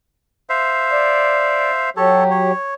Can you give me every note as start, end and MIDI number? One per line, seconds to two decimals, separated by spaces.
0.49 1.90 72
0.49 1.90 76
0.49 1.90 77
0.92 1.71 74
1.97 2.52 54
1.97 2.52 67
1.97 2.24 69
1.97 2.24 73
2.31 2.74 73